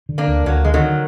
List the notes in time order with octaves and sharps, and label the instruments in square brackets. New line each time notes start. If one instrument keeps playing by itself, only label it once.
[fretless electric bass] D3
[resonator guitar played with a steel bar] A#3 D4
[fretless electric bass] D2
[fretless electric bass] D2 [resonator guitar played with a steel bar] F#3 A#3
[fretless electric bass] D3 [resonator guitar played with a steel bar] G#3
[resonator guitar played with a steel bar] D#3 F#3